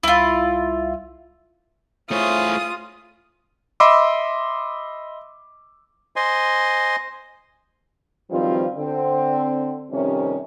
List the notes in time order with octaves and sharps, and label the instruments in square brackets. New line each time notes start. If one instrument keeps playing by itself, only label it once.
[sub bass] C2 [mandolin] E4 F4
[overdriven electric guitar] A3 C5 [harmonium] E4 G#4 C#5 [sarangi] F4 [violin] D#6
[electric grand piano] D#5 E5 B5 C6 D6 E6
[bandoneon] C5 D#5 G#5 C6
[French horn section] G2 D#3 F3 F#3 C4 F4
D3 C4
F2 C3 D#3 G3 C#4